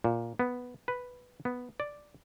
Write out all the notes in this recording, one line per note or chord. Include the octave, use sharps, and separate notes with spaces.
A#2
B3
B4
B3
D5